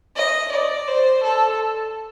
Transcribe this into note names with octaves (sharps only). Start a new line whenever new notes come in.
D#5
D5
C5
A4